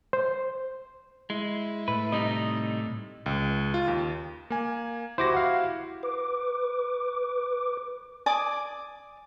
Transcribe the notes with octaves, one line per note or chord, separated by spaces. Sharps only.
C5
G#3 E4
A2 B4
C3 G3 D#4 D#5
C#2
F4
D#2
A#3 G#5
E4 F#4 G4 C5 D6 A#6
F5 F#5
B4 D6
D5 G#5 D6 D#6